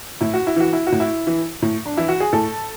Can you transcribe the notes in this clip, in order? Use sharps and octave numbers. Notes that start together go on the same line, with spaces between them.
A2 E4
F#4
E4
E3 F#4
E4
F#4
A2
E4
E3
A2
D4
E3 E4
F#4
G#4
A2 A4